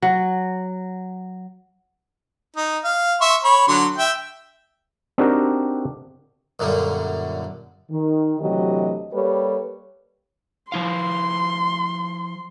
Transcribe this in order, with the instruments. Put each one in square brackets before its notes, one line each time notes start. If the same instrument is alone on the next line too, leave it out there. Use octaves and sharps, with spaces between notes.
[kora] F#3
[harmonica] D#4
F5
E5 C6 C#6
C#5 B5
D3 F#3 C6
E5 G5
[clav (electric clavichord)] C4 D4 D#4 F#4 G4 A#4
[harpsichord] F#2 A#2 D3 G3
[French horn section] D#3
D2 C3 E3 F#3 G4 D#5
G3 A#3 G4 A4 B4 C#5
[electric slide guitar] F3 E4 F5 [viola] C6